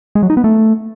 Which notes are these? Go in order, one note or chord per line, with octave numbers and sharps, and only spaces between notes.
G#3
F#3
D#4
B3
A3